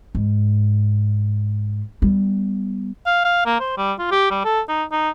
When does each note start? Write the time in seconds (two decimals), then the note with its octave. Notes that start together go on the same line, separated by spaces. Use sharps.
0.15 G#2
2.02 G3 B3
3.06 F5
3.25 F5
3.46 A#3
3.60 C5
3.78 G3
3.99 F4
4.11 G4
4.31 G3
4.45 A4
4.69 D#4
4.92 D#4